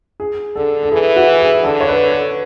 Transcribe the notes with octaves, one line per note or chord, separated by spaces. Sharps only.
G#4
D3 A4
A4
E3 G#4
F#4
G#4
D3 A4
C#5
B4
A4